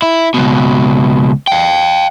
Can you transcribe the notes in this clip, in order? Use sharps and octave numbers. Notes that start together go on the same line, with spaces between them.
E4
C#2 B2
F5 G5